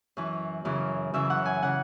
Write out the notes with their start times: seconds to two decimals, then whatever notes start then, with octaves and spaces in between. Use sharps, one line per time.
0.17 F#2 E3
0.65 F#2 C#3 E3
1.14 F#2 C#3 E3 E5
1.30 F#5
1.45 G#5
1.63 C#3 E3 F#5